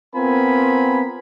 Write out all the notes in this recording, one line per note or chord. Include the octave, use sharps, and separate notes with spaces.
B3 C4 F4 A#4 G#5 B5